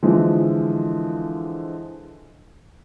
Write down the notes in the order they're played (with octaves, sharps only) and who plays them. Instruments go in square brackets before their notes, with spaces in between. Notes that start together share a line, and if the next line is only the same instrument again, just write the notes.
[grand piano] D3 E3 F3 G#3